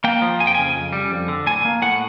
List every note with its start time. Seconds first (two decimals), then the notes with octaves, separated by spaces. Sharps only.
0.04 A#3 G5
0.22 F3
0.40 F2 G#5
0.47 G5
0.55 C#3 G#5
0.75 F2
0.93 G3
1.12 F2
1.28 D3
1.46 A2 G#5
1.65 A#3
1.82 A2 F#5